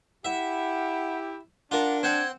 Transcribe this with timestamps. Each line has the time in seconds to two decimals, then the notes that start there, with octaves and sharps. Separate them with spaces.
0.25 E4 G4 E5 F#5
1.71 D4 F4 A#4 F#5
2.03 C4 C5 F#5 G#6